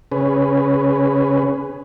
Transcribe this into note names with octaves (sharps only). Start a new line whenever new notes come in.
C#3 C#4 G#4 B4